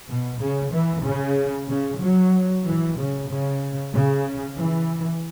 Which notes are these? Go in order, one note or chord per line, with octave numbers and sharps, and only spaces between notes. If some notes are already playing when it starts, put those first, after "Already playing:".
B2
C#3
E3
C#3
C#3
F#3
E3
C#3
C#3
C#3
E3